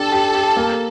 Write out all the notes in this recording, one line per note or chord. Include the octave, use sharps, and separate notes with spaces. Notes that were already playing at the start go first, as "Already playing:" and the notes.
Already playing: D4 G4 A4
G4
G4
A#3